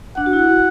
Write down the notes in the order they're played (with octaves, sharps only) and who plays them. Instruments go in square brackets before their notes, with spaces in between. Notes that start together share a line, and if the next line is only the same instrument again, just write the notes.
[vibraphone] D4 [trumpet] F#5
[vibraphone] F#4
E4
F#4